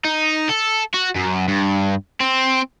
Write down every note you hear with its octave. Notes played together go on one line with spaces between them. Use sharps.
D#4
A4
F#4
F#2
G2
C4